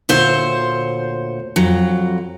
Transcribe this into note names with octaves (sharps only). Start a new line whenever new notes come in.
D2 A#2 C5 C#5
F2 F#3